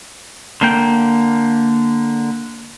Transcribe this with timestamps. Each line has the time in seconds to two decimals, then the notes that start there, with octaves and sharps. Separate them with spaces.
0.61 D3 A#3 G5